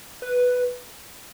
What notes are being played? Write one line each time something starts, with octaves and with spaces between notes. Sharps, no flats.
B4